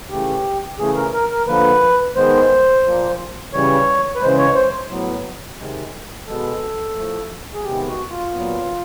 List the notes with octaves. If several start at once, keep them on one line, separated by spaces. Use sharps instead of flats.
C#3 E3 A3 G4
C#3 E3 A3 G#4
A#4
A#4
A#4
D3 F3 A#3 B4
D#3 G#3 B3 C5
A#2 F3 A#3
C#3 E3 G3 C#5
B4
C#3 E3 G#3 C5
C#5
C5
A2 F#3 B3
C3 D#3 G#3
B2 G#3 B3 A4
A2 F3 A3
G#4
C3 D#3 G#3 B3 G4
F#4
F4
A#2 F#3 B3